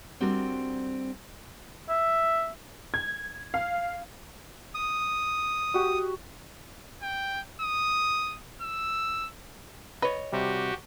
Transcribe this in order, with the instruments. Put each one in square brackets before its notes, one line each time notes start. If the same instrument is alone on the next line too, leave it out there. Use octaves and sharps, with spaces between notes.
[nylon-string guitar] G3 C4 D4 F#4 A4 A#4
[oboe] E5
[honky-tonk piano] G#6
F5
[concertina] D#6
[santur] F#4 G4
[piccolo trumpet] G5
D#6
E6
[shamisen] B4 [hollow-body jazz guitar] C#5 D#5
[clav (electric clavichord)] C3 G3 [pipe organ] F#4 G4